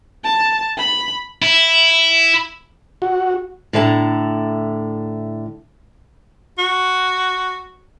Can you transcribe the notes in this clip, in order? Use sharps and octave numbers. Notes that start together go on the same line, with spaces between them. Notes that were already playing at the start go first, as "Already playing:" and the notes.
A5
B5
E4
F#4
A2 D3 E4 G#5 A#5
F#4